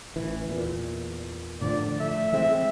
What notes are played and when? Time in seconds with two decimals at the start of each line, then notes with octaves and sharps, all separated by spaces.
0.16 A1 E3
0.49 E2 A#2
1.61 A2 D3 F3 D5
2.00 A3 E5
2.32 E3 G#3 C4 E5